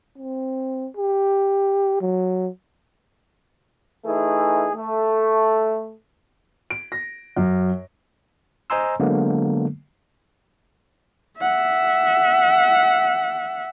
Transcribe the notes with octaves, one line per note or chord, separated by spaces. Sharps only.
C4
G4
F#3
E3 A3 D#4 G#4
A3
D7
A#6
F#2
C5 D#5 G#5 A#5 C6 E6
D3 F#3 G#3 A#3 B3
E5 F#5